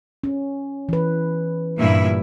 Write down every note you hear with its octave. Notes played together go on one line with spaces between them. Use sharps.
C#4
E3 B4
G2 A#2 E4